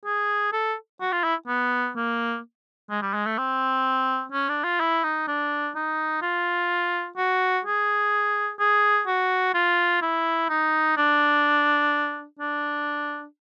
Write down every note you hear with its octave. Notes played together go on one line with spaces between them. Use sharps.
G#4
A4
F#4
F4
E4
B3
A#3
G#3
G3
G#3
A3
C4
C#4
D4
F4
E4
D#4
D4
D#4
F4
F#4
G#4
G#4
F#4
F4
E4
D#4
D4
D4